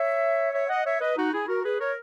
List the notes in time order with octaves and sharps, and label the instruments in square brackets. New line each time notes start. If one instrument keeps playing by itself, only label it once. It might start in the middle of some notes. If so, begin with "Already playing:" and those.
Already playing: [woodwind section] C#5 E5
C#5 E5
D#5 F#5
C#5 E5
B4 D#5
D#4 F#4
E4 G#4
F#4 A#4
G#4 B4
A#4 C#5